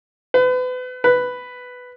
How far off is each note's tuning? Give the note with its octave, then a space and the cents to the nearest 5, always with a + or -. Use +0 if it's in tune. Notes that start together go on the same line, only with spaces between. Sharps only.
B4 +35
B4 +5